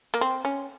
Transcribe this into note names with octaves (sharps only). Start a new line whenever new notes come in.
A#3
C4
C#4